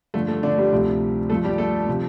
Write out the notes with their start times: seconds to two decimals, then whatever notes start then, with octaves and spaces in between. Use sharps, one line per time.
0.14 G2 D3 F3 A3
0.28 A3
0.43 D3 D4
0.58 G3 G4
0.72 D2 C3 F3
1.30 G2 F3 A3 A4
1.44 G3 G4
1.58 A3 A4
1.87 C3 F3